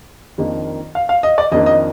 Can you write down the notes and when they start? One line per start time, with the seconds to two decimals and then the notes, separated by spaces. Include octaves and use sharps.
0.38 F2 D#3 A#3 D4
0.95 F5
1.09 F5
1.23 D#5
1.38 D5
1.52 F2 D#3 A#3 D4 D#5
1.66 D#5